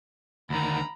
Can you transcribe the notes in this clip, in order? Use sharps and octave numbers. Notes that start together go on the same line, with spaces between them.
D2 D#3 A#5 B5